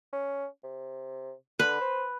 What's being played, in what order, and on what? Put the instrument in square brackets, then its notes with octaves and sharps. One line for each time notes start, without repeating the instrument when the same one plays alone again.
[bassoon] C#4
C3
[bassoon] D3 [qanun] B4
[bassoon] C5